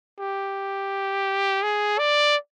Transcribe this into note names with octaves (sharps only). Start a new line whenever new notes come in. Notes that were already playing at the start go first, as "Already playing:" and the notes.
G4
G#4
D5